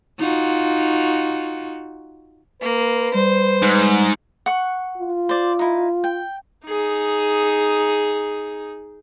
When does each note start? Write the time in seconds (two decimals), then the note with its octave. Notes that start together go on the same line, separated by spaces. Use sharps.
0.19 D#4 F4 F#4
2.62 A#3 B4
3.14 G3 C5
3.63 G#2
4.46 F#5 C#6
4.98 F4
5.29 C5 D5
5.59 D#4 E4
6.04 G5
6.66 D#4 G#4